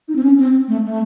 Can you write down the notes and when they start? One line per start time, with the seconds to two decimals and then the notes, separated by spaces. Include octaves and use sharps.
0.08 D#4
0.16 C4
0.23 C#4
0.38 C4
0.68 A3
0.86 A3